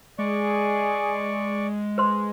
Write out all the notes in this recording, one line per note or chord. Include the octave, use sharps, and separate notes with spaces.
G#3 G#4 D5 C#6
B4 C5 C6